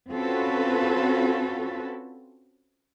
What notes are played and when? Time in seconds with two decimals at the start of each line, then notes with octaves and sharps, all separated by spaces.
0.10 C4 C#4 F4 F#4 A4 B4